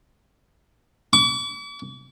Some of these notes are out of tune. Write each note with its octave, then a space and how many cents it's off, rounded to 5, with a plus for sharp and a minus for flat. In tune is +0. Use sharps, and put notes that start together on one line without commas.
D6 -45